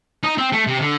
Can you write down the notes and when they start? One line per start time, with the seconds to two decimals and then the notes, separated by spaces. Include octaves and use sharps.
0.23 D#4
0.38 C4
0.52 A3
0.67 C3
0.81 D3